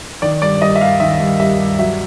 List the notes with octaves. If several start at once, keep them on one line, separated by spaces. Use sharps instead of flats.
D#3 D5
G2 D5
G3 D#5
E5
G2 F5
D#3 E5
G2
G3 E5
G2
F#3 E5